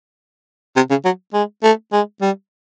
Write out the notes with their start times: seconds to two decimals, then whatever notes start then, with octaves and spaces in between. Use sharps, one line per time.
0.76 C3
0.90 C#3
1.05 F#3
1.33 G#3
1.63 A3
1.92 G#3
2.21 G3